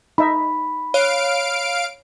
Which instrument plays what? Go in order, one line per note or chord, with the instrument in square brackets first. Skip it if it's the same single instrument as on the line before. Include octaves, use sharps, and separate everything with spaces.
[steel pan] D#4 E5 [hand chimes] B5
[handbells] C#5 [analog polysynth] F5 D7